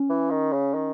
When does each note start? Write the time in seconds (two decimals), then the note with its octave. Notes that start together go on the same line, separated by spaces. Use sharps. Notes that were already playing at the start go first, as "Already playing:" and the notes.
Already playing: C#4
0.10 E3
0.30 D#3
0.53 C#3
0.74 D#3